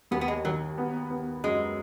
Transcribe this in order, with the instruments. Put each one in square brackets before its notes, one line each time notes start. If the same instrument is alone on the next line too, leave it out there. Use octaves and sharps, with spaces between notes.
[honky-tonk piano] D#2 [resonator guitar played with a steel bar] B3
[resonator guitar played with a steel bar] B3
G#3
[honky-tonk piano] D#3 [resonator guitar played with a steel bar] F#3
[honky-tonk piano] B3
B3
[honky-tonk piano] F#2 [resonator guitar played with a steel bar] G#3